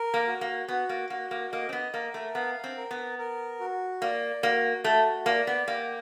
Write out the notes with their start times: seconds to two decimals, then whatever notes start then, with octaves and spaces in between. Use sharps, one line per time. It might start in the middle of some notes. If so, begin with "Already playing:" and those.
Already playing: A#4
0.14 A#3
0.27 F#4
0.41 A#3
0.68 B3 F#4
0.89 A#3
1.10 A#3 F#4
1.31 A#3
1.52 A#3 D#5
1.69 C4
1.73 B3
1.93 A#3 A#4
2.14 A3
2.35 B3 F5
2.64 C4
2.77 A#4
2.91 B3
3.18 A#4
3.60 F#4
4.02 A#3 D5
4.43 A#3 F#4
4.84 A3 F#4
5.26 A#3 D5
5.47 B3
5.67 A#3 G4